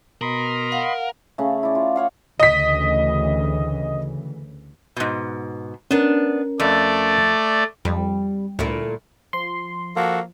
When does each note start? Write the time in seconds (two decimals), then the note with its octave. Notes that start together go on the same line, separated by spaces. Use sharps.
0.21 B2 A#4 D#5 B5 C6
0.72 F5 F#5
1.38 C#3 A3
1.63 E4 D5
1.75 F4
1.96 C#5 F5 F#5
2.40 D2 C#3 E3 D#5 B6
4.97 G#2 B2
5.91 B3 C#4 D4 A#4
6.60 F2 A3 D5
7.85 F2 G3
8.59 D2 A#2 A3 E4
9.33 F3 C6
9.96 F3 A#3 F#4 A4